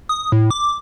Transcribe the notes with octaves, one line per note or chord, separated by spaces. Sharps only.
D#6
A2
D6